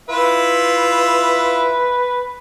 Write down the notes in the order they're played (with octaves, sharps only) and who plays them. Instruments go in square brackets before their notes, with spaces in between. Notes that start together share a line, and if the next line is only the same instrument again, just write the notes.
[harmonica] E4 F4 E5 [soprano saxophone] B4